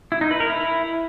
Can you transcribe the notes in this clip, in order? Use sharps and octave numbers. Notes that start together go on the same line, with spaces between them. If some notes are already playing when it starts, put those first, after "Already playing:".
E4
D#4
B4
A#4
E4